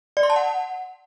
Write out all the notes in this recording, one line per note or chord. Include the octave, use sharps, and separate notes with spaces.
D5
C6
A5
F#5